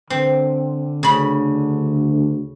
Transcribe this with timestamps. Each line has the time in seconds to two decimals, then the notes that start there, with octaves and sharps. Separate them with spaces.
0.10 D3 C4
1.03 D2 C#3 B5